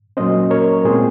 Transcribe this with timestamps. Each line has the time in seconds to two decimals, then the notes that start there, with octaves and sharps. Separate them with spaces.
0.17 A#2 F#3 A#3 C#4 C5 D#5
0.51 A#4 C#5
0.85 A#2 G#3 C4 G#4 C5